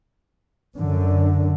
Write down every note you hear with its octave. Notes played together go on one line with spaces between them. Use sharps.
F#2 D3